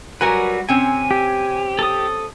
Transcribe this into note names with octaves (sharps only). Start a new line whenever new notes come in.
F#3 G3 F#4 A#4 B4 G#5
C3 C4 C#4 G#5
G4
A4 D#6